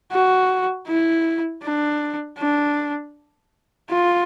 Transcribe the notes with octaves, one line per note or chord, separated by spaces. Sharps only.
F#4
E4
D4
D4
F4